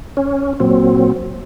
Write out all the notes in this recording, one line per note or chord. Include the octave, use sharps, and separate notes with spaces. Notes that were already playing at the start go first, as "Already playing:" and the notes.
C#4
A#2 F#3 C4